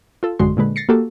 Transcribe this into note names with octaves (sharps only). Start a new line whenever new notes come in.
F4 A4
A1 F#2 D3 G#3 F#4 C6
A#2 D3 G#3 B4
A6 A#6 C7 C#7
A#3 F#4 G4 A4